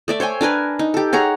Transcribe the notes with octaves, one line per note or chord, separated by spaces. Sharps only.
A3 D5 E5
C5 C#5 G5 G#5
D4 A#4 B4 G#5
D#4
G4 A4
G#4 C#5 F#5 A#5